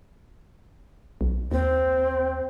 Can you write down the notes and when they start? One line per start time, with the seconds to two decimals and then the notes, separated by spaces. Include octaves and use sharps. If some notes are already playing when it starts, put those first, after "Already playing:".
1.21 B1
1.51 D#2 C4